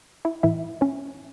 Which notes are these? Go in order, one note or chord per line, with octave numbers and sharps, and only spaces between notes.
E4 E5
A2 E3 E4 E5
C#4 C#5